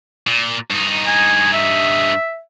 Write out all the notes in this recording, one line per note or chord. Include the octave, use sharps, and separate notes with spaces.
A#2
G2 D#4
G#5
E5